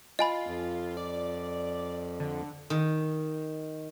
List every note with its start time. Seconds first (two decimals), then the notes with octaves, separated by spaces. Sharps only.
0.19 F4 D#5 G#5 B5
0.47 F2
0.97 D5
2.20 D3
2.70 D#3